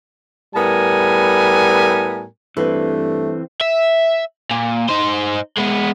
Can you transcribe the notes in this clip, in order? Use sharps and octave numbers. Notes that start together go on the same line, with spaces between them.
A2 G3 B3 A#4 G#5
G2 E3 A3 C4 B4
E5
A#2
D#4 C5
G#3 B3